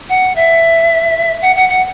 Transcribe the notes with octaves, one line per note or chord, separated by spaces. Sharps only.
F#5
E5
F#5
F#5
F#5